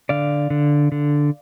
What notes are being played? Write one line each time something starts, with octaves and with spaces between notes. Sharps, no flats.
D3 D5 F5
D3
D3